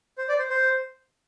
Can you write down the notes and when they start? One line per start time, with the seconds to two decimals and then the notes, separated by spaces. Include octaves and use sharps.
0.18 C5
0.29 D5
0.38 C5
0.50 C5